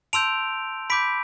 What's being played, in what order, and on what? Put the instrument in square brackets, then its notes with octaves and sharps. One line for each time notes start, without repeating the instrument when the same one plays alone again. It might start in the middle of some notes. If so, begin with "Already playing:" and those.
[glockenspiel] A5 C6 E6 G6 D7 F7
B5 D6 G6 B6 D7